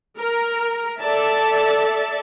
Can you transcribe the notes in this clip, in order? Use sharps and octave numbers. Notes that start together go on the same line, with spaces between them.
A#4
A4 D5 E5 A5